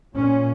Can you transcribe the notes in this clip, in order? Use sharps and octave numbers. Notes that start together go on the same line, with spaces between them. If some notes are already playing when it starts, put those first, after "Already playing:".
A#2 C#4